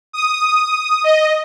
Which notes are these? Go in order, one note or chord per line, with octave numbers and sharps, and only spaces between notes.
D#6
D#5